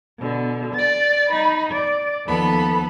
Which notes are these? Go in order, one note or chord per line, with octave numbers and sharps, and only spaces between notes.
B2 D3
D5 A6
D#4 B5
D5
D#2 F3 B3 A4 B5